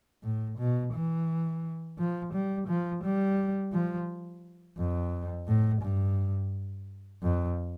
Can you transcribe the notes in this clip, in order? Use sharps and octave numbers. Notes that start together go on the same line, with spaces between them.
A2
B2
E3
F3
G3
F3
G3
F3
F2
A2
G2
F2